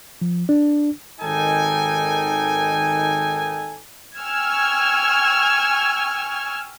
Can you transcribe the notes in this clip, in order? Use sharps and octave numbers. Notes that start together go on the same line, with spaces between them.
F3
D4
G#1 D#3 D#4 A4 G5 G#5
G5 G#5 C#6 E6 F6 G#6